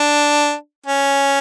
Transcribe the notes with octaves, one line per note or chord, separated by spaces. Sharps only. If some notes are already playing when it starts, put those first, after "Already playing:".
Already playing: D4
C#4